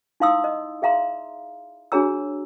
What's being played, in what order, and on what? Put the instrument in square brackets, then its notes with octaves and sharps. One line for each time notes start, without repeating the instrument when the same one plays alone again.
[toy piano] D#4 E4 F5 C6 D#6 E6
D#5
G#4 E5 F5 A#5 C6
D4 F#4 G#4 C#5 A#5 E6